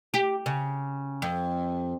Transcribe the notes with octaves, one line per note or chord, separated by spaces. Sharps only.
G4
C#3
F2